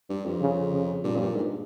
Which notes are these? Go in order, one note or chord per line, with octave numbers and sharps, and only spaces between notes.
G2
F2
C#3
C#3
G2 A#2
F2
G2
G#2